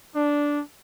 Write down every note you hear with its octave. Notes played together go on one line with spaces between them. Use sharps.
D4